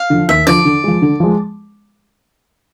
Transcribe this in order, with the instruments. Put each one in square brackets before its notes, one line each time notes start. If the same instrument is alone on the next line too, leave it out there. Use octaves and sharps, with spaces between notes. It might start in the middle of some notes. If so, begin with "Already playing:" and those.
Already playing: [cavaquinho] F5
[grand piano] D3 F3
[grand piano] D#2 [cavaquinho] E5
[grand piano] D3 F3 [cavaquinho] D5
[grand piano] D3
F3 G#3
D3
F3 G#3